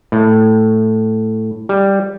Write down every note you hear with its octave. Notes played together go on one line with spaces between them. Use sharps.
A2
G3